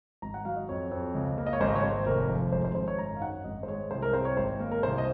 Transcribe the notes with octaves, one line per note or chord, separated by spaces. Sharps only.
G#1 A#5
F#5
F#3 F5
D#5
F2 C#5
F2
C#2
A#3
D#5
C#5
G#1 C5
D#5
C#5
G#1 C5
F1 A#4
F3 C5
G#1 C5
C5
G#1 C5
C#5
F#2 A#5
F5
D#4 F#5
G#1 D#5
C5
G#3 C#5
C2 C5
A#4
C4 C5
C#5
G#1 C5
A#3
A#4
C2 C5
D#5